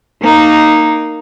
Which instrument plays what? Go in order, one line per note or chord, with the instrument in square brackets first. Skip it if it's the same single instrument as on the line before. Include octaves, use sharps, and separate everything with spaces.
[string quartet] A#3 D#4